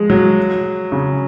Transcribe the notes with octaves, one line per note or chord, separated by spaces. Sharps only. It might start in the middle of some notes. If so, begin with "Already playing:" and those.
Already playing: F3 G#3
F#3
C#3